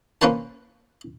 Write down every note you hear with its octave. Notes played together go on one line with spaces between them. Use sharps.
A#3 C#4 B4 C5 A5